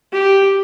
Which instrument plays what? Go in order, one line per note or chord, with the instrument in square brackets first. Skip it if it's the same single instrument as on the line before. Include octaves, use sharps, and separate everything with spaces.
[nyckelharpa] G4